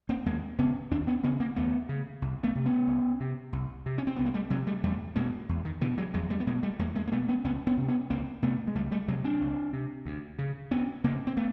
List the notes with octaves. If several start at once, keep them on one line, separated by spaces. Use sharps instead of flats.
A#3 C4
D#2 G#3 A#3
C#3 B3 C#4
D#2 C4 D4
B3 C#4
C#3 B3 C#4
A#3 C4
D#2 A3 B3
C#3
C2
A3 B3
C3
B3 C#4
C2
C3
C2
C3
C#4
C4
C2 B3
A#3
G3 A3
C3 F#3 G#3
G3 A3
E2 G3 A3
B2 G#3 A#3
E2
D#3
B2 D3 E3
F#3 G#3
E2 F#3 G#3
G3 A3
B3
B2 G#3 A#3
G3 A3
E2 G#3 A#3
G#3 A#3
A#3
B2 A3 B3
B3 C#4
C#2 B3 C#4
B3 C#4
C3
B3 C#4
C#2 A#3 C4
C3 A3 B3
G#3
C#2 G3 A3
G3 A3
C3 F#3 G#3
C4 D4
C#2
C3
D2
C#3
D2 B3 C#4
C#3 A#3 C4
C4
A3 B3